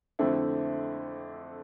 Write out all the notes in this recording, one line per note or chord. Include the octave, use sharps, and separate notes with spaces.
F2 D3 A3 C4 E4